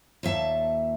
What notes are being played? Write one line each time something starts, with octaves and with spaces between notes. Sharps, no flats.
D#2 A#2 E5 A5